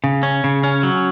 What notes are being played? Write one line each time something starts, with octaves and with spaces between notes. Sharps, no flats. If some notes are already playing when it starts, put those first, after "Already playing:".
C#3
C#4
C#3
C#4
F#3